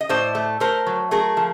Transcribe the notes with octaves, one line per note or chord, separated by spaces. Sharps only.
D#5
A2 C5 D5
A3
A3 A#4 C5
F#3
A3 G#4 A#4
F3